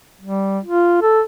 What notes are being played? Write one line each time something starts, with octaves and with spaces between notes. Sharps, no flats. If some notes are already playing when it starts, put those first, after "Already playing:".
G3
F4
A4